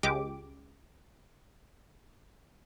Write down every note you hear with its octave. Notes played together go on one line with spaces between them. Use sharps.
C#2 G#3 G4 D6